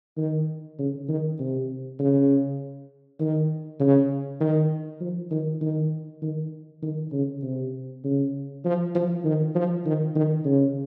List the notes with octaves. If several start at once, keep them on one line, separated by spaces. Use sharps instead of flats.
D#3
C#3
D#3
C3
C#3
D#3
C#3
D#3
F3
D#3
D#3
D#3
D#3
C#3
C3
C#3
F3
F3
D#3
F3
D#3
D#3
C#3